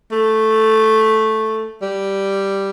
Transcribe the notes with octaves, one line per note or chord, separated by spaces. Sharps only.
A3
G3